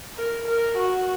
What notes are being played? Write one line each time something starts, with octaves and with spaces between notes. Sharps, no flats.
A#4
A#4
F#4